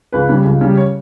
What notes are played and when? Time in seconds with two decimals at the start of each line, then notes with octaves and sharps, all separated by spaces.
0.13 C#2 B4
0.29 C#3 G3
0.45 C#2
0.61 C#3 G3
0.77 C#5